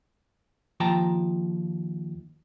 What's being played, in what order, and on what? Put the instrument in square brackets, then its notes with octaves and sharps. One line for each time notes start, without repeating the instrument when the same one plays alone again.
[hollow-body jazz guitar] D#2 F3 G5 A5 A#5